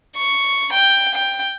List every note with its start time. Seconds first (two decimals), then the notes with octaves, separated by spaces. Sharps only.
0.16 C#6
0.72 G5
1.14 G5